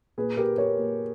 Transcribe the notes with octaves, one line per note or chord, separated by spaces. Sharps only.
A#2 G#4 B4
G4 A#4
A#4 C#5
A#2